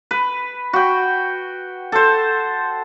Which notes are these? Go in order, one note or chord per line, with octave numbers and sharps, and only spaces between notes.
B4
F#4 G5
A4 C5